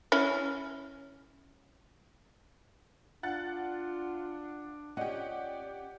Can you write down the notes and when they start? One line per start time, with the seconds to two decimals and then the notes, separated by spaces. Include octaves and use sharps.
0.12 C#4 E4
3.23 D4 F4 F#5 F#6 A6
4.97 C#4 F4 G4 D5 D#5 F#5